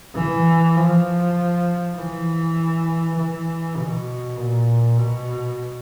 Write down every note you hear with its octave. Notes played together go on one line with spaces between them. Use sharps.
E3
F3
E3
E3
B2
A#2
B2